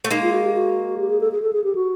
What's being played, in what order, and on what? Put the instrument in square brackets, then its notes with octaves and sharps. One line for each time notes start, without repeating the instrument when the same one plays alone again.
[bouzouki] A3
[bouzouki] G#3 A#3 [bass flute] D#4
[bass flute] F4
F#4
G4
F#4
G4
G#4
A4
G#4
A4
G#4
G4
F#4